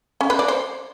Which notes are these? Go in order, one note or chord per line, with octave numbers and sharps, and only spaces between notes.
C#4
B4
D5
C5